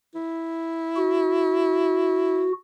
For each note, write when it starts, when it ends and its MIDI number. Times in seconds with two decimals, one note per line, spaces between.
0.15 2.48 64
0.96 2.52 66